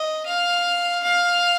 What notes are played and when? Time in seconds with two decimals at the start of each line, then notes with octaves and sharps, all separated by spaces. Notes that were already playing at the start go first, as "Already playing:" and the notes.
Already playing: D#5
0.26 F5
1.03 F5